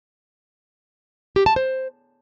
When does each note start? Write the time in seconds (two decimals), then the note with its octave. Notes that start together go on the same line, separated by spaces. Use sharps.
1.36 G4
1.46 A5
1.56 C5